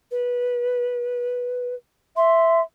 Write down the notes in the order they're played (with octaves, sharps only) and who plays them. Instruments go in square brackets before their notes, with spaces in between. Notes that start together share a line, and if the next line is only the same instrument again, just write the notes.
[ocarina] B4
[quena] E5 [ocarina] C6